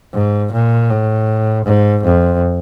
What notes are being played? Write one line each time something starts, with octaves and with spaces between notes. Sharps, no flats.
G#2
A#2
A2
G#2
F2